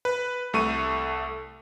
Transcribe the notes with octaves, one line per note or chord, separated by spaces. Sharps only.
B4
C2 A3 C#6 D#7